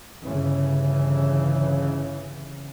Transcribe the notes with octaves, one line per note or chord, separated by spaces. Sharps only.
G1 C#3 E3